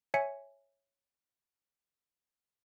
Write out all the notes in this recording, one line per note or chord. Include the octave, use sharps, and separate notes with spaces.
C#5 E5 G#5 C#7